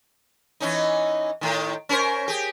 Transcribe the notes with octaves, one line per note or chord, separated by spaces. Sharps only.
E3 C#4 D#4
A2 D#3
C#4 A#4 C5
G4 G#4